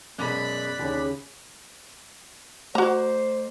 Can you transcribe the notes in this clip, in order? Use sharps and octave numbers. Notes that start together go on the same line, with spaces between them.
F#2 B2 G#3 D5 B5 F#6
D#2 C#3
A3 F#4 C5 A#5